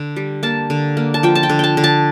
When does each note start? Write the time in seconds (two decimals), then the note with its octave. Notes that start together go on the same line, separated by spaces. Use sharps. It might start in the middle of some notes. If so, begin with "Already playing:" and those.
Already playing: D3
0.16 G3
0.43 A#3 A5
0.70 D3
0.97 A#3
1.14 A5
1.23 F3 G5
1.35 A5
1.43 G5
1.49 D3
1.59 G5 A5
1.77 D3
1.84 A5